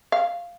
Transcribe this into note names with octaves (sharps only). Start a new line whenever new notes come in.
F5